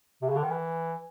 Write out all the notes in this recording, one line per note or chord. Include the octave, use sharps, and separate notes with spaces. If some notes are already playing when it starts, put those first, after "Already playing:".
C3
C#3
D3
D#3
E3